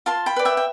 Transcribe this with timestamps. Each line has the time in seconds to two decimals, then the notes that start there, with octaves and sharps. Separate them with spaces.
0.06 F4 A5 C6
0.26 G5 B5
0.36 B4 D5
0.45 E5 G5
0.57 G5